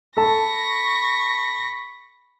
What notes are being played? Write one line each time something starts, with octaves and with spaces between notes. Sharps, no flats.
A4 A5 B5 C#6 A#6